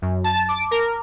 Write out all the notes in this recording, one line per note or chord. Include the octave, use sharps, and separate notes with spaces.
F#2
A5
D6
A#4